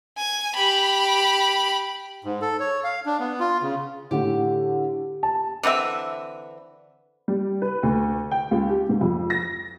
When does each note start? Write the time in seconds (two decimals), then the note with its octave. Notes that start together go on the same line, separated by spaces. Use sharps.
0.17 G#5
0.54 G4 B5
2.24 G#2
2.42 A4
2.60 C#5
2.84 F5
3.06 D4
3.20 B3
3.40 F4
3.62 C#3
4.11 A2 D3 G4
5.23 A5
5.63 D3 E3 C4 E5
7.28 G3
7.62 B4
7.83 D2
8.31 G5
8.51 C#2
8.69 G4
8.89 G#2
9.01 F2
9.30 A#6